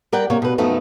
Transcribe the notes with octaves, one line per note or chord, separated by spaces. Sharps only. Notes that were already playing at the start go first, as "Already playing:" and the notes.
G3 A#4 D5 F#5 G5
C3 A#3 C#5
B2 B4
F#2 F3 A3 B3 D#4